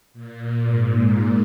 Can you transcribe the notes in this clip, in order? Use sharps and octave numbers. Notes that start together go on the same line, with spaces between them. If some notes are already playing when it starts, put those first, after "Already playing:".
A#2
G#2